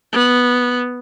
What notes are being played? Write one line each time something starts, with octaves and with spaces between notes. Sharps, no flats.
B3